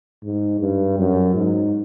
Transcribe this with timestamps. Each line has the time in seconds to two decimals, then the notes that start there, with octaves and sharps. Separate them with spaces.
0.24 G#2
0.60 G2
0.98 F#2
1.35 G#2